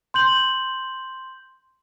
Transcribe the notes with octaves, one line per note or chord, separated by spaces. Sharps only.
C6 G6 F#7